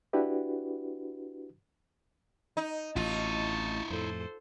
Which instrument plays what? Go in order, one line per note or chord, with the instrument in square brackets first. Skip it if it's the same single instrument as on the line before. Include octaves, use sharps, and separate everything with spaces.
[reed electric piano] D4 E4 F#4 G4 B4
[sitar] D#4
[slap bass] A1 [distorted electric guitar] E4 D#5 [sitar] F4 [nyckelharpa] A5 C#6
[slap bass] F2 A2 [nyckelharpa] A4 C5